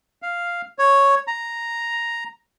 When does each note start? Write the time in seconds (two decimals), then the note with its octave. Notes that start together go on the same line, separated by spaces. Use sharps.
0.22 F5
0.79 C#5
1.27 A#5